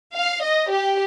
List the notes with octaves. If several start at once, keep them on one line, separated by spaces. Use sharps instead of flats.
F5
D#5
G4